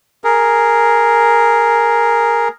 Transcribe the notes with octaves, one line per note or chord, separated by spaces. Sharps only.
G#4 A#4